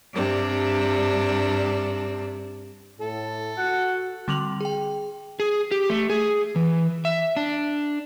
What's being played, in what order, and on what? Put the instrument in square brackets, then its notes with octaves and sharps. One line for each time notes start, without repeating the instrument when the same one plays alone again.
[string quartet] G2 C3 D4
[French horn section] A2 [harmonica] A4
[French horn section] F#4 [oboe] F#5
[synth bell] D3 G3 C4 D6 F7 F#7
G#4 G5
[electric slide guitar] G#4
G4
A3
G#4
E3
E5
D4